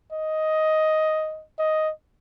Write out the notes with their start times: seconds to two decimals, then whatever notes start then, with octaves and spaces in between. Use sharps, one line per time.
0.13 D#5
1.59 D#5